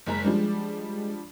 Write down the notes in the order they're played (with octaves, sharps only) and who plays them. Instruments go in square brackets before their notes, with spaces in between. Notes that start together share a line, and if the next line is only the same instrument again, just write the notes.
[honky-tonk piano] F#1 G#3 A#5 [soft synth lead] B6
[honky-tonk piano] F3 G3 D4 [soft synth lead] G#3